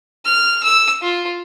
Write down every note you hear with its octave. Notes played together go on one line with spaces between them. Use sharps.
F6
E6
F4